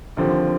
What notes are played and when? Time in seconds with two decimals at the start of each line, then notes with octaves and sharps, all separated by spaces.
0.17 D#2 D3 F3 C4